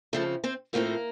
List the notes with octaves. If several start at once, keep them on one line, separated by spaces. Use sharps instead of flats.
C#3 F3 A3 C4 A4
C4 C5
A2 F3 A3 A#3 C4 A#4